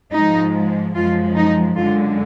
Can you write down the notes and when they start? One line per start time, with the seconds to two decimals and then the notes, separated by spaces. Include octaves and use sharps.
0.13 G#2 F3 G#3 D#4
0.94 F#2 F3 G#3 F4
1.36 D#4
1.76 F#2 D3 G#3 F4